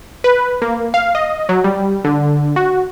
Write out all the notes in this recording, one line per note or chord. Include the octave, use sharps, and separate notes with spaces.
B4
A#3
F5
D#5
F#3
G3
D3
F#4